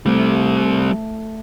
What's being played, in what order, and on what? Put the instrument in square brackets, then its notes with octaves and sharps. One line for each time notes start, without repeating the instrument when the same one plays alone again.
[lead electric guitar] G3 C4 [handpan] A3